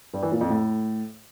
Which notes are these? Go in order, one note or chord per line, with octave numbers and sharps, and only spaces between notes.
G2
E3
A#2
F2
A2